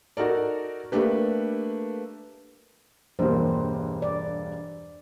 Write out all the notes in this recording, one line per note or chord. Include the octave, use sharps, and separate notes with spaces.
D#4 F#4 A4 A#4 D5
A3 A#3 D4 G4 B4
E1 G2 A#3 C5
D5